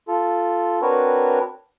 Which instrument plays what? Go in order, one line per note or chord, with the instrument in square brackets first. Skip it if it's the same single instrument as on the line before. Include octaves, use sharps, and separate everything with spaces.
[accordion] F4 A4
C4 D4 F#4 A#4 B4 C#5